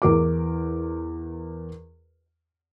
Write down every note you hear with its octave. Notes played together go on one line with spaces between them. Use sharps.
E2 A#4 D6